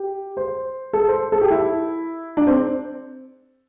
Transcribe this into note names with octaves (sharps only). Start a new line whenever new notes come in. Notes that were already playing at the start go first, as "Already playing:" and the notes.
Already playing: G4
C5
A4
C5
A4
G4
E4
D4
C4